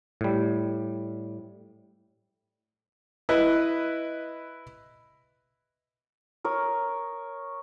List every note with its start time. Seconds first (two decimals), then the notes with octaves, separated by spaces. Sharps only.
0.21 A2 G3
3.29 E4 B4 D#5
6.44 A#4 C#5 D#6